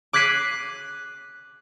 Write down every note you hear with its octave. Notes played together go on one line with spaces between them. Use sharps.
D6 F#6 G#6 B6 C7 D#7